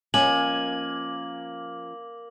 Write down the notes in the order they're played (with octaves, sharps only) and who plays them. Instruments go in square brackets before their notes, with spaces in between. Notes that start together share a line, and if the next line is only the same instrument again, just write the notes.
[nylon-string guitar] F3 C#4 D#5 [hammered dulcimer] A#3 [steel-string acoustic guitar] G#5 [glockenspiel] F#7